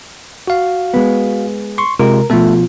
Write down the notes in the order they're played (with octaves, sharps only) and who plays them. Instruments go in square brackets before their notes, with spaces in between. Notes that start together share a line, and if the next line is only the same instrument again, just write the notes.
[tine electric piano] F#4 F5
[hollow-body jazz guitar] G#3 B3
[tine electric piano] C6 C#6
[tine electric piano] C3 G#3 F4 [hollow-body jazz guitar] A#4
[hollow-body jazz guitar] B2 F3 [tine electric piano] A3 A4